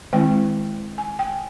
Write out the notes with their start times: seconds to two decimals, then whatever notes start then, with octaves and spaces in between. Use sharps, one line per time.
0.13 D#3 G#3 C4 E4 G5
0.98 G#5
1.19 G5